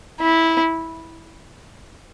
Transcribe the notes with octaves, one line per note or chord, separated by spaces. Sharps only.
E4